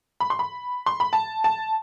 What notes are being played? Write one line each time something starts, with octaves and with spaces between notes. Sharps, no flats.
B5
C6
B5
C6
B5
A5
A5